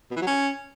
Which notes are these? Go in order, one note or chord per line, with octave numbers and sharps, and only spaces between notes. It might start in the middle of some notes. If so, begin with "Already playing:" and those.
B2
E3
F#3
C#4